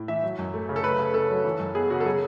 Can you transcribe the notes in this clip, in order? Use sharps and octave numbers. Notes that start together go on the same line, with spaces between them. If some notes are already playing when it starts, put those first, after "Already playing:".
Already playing: A2
E3 E5
F#3
F#2
A3
C#3
A4
A3 B4
C#3
C#4 A4
F#3
E3
F#2
B3 G#4
C#3 F#4
A4
F#3 G#4